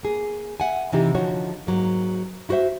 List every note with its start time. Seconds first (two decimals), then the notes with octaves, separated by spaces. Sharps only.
0.03 A#3 G#4
0.60 E5 F#5 G#5
0.93 C3 E3 D#4 G4
1.14 D3 F3 D#4 F#4 C#5
1.67 G#2 F#3 A#3
2.49 E4 F#4 B4 C5 E5